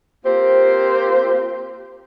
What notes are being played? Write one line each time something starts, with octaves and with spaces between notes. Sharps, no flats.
A#3 C4 F4 G4 C5